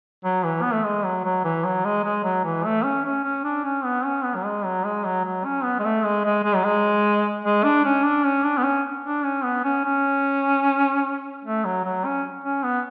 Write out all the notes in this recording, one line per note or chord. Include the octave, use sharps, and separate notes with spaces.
F#3
E3
B3
A3
G#3
F#3
F#3
E3
F#3
G#3
G#3
F#3
E3
A3
C#4
C#4
C#4
D4
C#4
B3
C#4
B3
F#3
G#3
F#3
G#3
F#3
F#3
C#4
B3
G#3
A3
G#3
G#3
G#3
F#3
G#3
G#3
D4
C#4
D4
C#4
D4
B3
C#4
D4
C#4
B3
C#4
C#4
A3
F#3
F#3
C#4
C#4
B3